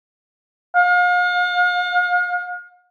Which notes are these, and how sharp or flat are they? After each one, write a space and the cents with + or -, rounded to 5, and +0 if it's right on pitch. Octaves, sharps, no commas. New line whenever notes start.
F5 +40